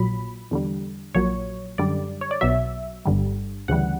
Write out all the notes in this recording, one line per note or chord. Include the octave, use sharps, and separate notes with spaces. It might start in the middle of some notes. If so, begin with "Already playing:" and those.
Already playing: A#1 A#2 F#3 B5
E2 D3 G3
A#1 A#2 F#3 C#5
F#2 D3 G3 D5
C#5
D5
B1 B2 F#3 E5
G1 G2 D3 G3
D2 C#3 E3 G3 F#5